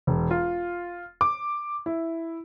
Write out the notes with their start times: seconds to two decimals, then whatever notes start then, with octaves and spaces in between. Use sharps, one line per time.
0.07 E1
0.31 F4
1.21 D6
1.86 E4